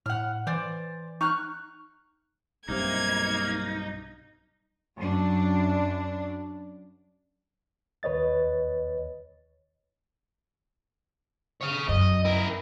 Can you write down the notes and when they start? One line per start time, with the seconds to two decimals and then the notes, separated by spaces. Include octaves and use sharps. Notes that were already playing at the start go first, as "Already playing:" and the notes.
0.06 A2 F#5 F6
0.47 E3 C5 D5
1.21 D#4 C#6 F6 F#6
2.69 B1 G2 C3 A#3 D#4 G#6
4.96 F#2 D4
8.03 D#2 B4 C#5 D#5 A6
11.61 C#5 F5
11.89 F#2 D#5
12.25 E4 A#4